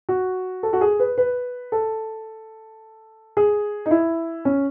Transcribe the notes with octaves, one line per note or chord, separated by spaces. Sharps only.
F#4
A4
F#4
G#4
B4
B4
A4
G#4
D#4
E4
C#4